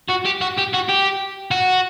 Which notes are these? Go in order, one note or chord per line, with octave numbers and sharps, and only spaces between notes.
F#4
G4
F#4
G4
F#4
G4
F#4